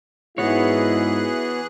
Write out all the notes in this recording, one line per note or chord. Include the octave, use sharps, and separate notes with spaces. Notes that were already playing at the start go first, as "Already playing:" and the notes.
G#2 E3 B3 E4 F#4 G#4 C#5 F#6